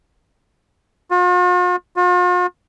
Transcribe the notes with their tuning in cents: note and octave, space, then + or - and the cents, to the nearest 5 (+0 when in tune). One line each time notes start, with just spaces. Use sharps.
F4 +45
F4 +45